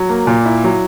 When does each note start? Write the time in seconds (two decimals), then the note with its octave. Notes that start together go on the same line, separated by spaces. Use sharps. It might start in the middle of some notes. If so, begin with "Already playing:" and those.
Already playing: F#3
0.09 A#3
0.27 A#2
0.46 E4
0.64 F#3